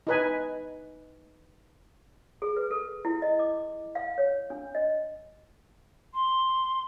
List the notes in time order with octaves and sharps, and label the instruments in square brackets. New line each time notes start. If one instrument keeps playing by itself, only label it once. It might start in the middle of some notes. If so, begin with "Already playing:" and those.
[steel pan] D#4 B4 G#5
[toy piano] G#4
B4
A4
E4
D#5
D6
F5
C#5
D4
D#5
[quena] C6